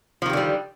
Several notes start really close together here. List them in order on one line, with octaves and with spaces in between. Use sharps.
F3 D#3 G4 D3 G3